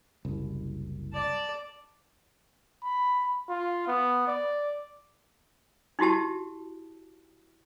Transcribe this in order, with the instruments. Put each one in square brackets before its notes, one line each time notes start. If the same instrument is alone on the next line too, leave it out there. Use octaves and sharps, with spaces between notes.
[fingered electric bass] F#1 C2
[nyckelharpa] D5 A5
[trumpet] B5
F4
B3
D5
[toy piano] D#4 E4 F#4 G4 A5